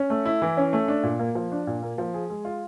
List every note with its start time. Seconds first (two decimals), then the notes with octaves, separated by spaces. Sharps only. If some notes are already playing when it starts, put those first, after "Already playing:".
Already playing: C#4
0.10 A3
0.25 E4
0.42 E3
0.57 C#4
0.73 A3
0.88 D4
1.03 A#2
1.19 A#3
1.35 F3
1.52 D4
1.67 A#2
1.83 A#3
1.98 F3
2.14 G#4
2.30 G#3
2.45 F4